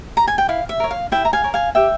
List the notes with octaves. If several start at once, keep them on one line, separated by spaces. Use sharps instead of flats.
A#5
G#5
G5
E4 F5
E5
A#4 C#5
F5
E4 E5 G5
A#5
F5 G#5
A#4 C#5
F5 G#5
G4 E5 G5